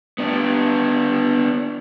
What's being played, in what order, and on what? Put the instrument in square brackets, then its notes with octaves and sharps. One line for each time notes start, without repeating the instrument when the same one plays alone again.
[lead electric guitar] B3 D4